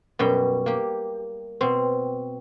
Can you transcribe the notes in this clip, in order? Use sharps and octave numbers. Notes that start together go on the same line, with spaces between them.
F#2 B2 G3 G5
A#3 G4
B2 C4